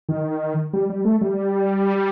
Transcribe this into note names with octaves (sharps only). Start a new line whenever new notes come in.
D#3
G3
G3
A3
G3